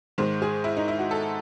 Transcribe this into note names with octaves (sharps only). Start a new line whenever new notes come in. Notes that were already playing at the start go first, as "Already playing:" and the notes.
G#2 D#3 G#3 C5
G#4
E4
D#4
E4
F#4
A4